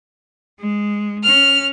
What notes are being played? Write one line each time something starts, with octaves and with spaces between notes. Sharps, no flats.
G#3
C#4 F6